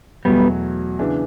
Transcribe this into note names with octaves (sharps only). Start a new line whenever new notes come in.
E2 B2 F#3 G3 A3 B3
C#3 E3 B3 D4